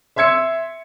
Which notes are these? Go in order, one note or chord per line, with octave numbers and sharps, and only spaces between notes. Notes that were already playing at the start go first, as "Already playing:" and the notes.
E5 C6 E6 G#6 C#7